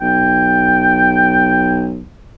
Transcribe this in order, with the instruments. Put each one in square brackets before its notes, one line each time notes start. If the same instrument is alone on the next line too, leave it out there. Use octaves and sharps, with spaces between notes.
[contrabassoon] B1 [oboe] G5